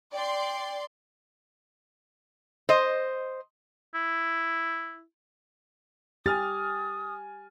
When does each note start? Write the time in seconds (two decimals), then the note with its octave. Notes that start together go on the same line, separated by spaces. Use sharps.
0.14 D5 G5 C6
2.69 C5 D#5
3.95 E4
6.26 G4 G#5 D#6 F6 A6